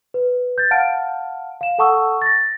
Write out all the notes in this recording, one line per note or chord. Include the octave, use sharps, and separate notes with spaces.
B4
G6 A6
F5 F#5 A5 F6 D7
F5 E7
A4 F#5 A5 C#6 D#6 E6
A6 A#6